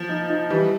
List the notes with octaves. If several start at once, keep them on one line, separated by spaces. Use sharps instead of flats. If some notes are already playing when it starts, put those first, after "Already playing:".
Already playing: F3
D#4
D#4
E3 G3